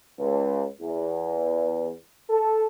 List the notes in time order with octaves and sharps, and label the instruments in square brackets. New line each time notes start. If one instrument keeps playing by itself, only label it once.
[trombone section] C#2
E2
A4